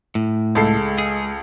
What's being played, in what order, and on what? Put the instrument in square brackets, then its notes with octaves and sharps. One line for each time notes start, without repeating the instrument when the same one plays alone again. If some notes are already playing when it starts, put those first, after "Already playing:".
[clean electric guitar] A2
[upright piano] C#2 A4 C7 [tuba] G#3
[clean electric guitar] G#4